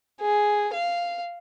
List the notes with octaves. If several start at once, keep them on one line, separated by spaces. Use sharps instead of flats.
G#4
F5